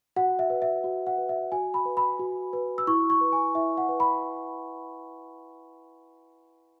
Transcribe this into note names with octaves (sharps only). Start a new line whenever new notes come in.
F#4 F#5
E5
B4
E5
F#4
F#5
B4
E5
F#4 G#5
B5
B4
B5
F#4
B4
E6
E4 C#6
C#6
B4
G#5
E4 E5
F#5
B4
B5